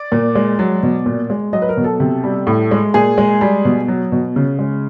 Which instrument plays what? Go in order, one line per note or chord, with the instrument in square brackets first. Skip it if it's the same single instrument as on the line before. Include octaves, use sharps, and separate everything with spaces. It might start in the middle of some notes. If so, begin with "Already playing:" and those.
Already playing: [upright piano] D5
A#2
G#3
F#3
B2
A#2
G#3
F#3 D#5
B4
A#4
B2
A4
C3
G3
A2
G#3
A#2 G#4
G#3
G3
B2
F#3
B2
C#3
G#3